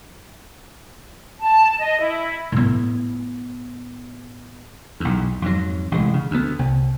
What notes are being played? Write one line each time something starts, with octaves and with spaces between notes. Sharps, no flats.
A5
D#5
E4
A2 B3
B1 E2
F2 G#2 F#3
A1 C3 D#3 G#3
C#3
D2 B3
C2